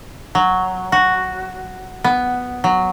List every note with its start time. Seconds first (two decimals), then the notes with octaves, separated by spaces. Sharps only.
0.35 F#3
0.92 F#4
2.04 B3
2.64 F#3